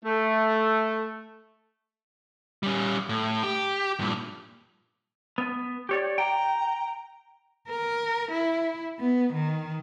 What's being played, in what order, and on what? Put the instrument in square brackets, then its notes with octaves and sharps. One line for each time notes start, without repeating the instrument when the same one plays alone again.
[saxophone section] A3
[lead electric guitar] G3 C#4
A2
G4
G2 A#2
[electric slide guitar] B3
G4 C#5 D5
[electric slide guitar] G5 [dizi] A#5
[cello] A#4
E4
B3
D#3